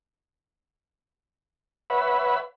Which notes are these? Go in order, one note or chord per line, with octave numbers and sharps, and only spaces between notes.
B4 C#5 E5 F#5 B5